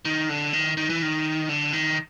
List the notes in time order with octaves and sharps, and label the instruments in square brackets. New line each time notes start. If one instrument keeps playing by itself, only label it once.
[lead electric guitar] D#3
D3
D#3
D#3
E3
D#3
D3
D#3